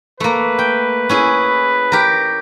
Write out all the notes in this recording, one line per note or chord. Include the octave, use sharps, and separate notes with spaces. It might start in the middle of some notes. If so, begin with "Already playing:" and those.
A3 A#3 B4
G5
C#4 E4 G#4
G4 A#4